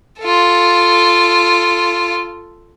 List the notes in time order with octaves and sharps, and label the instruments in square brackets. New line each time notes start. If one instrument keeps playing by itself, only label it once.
[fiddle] F4 A4